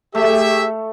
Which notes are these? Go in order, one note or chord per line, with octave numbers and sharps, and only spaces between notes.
A3 G4 G#4 E5